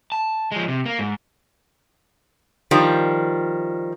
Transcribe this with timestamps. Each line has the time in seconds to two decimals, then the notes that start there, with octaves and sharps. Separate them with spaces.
0.12 A5
0.52 F3 G#3
0.68 C3
0.86 A#3
0.99 G#2
2.71 D#3 F3 G3